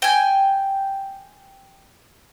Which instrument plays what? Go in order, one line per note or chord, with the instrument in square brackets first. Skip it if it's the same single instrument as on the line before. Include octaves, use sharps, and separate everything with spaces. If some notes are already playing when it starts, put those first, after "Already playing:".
[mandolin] G5 G#5